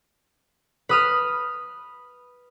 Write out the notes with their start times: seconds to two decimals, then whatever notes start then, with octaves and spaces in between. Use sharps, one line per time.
0.89 B4 D#6 F6